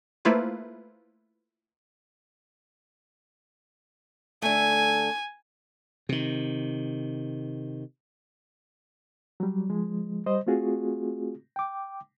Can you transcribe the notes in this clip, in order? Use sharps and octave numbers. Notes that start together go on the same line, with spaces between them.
A3 A#3 E4 F4 B4 C5
D3 A3 G#5
C3 D#3
F#3 G3
F3 G#3
G3 C5 D#5
A3 C4 F4 F#4 G#4
G5 D6